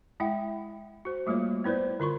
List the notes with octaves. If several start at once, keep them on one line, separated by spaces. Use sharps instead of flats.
G#3 E4 E5 F#5 G5
F#4 C5
G3 A3 A#3 F4 C#5
B3 E4 B4 C5 D5
D3 F4 C6 C#6